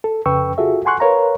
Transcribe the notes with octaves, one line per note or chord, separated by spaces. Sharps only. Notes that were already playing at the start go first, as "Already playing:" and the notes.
A4
F2 C#3 B4 G5 C#6 E6
F4 F#4 G#4 A4 E5
F#5 G#5 C6 C#6 F#6
A#4 B4 C#5 F5 A#5